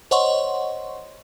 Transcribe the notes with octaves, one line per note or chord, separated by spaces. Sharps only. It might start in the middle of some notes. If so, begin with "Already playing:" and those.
C5 C#5 D#5 F#5 C6 C#6